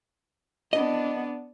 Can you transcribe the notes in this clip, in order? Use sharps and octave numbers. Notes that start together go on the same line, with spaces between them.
B3 D4 D#5